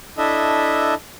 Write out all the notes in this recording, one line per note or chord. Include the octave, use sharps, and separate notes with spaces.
D4 E4 A4 D#5 E5